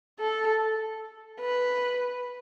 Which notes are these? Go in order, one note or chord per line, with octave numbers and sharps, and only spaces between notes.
A4
B4